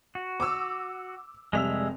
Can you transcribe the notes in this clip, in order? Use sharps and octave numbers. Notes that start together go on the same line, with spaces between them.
F#4
D6 E6
F1 G3 G#3 E5 E6 F7